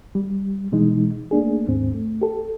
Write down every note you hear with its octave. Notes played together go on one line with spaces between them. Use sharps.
G3
B2 E3 G#3 D#4
A3 A#3 D4 G#4
D#2 G#2 C4
A3
G4 A4